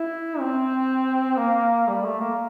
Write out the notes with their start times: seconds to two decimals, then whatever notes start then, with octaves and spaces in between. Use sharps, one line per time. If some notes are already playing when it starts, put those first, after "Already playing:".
Already playing: E4
0.39 C4
1.37 A#3
1.88 G3
2.04 A3
2.20 A#3